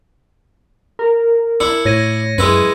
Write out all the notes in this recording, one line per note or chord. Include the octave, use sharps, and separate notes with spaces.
A#4
D4 E4 C#7
A2 C#5 G#6 A#6 D#7
F#2 G#3 E4 B4